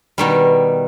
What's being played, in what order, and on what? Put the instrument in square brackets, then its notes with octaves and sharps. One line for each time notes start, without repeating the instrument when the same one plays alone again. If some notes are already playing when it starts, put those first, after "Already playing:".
[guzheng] B2 D#3 G3